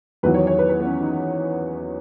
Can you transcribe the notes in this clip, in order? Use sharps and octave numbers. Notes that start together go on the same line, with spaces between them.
E2 D#3 F#3 B4
C#5
C#5
B4
B4
B3
C#4
D#4